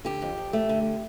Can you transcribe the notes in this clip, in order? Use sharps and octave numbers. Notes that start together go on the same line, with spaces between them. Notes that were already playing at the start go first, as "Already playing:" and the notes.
D3 G4
F2
F2
A3
D3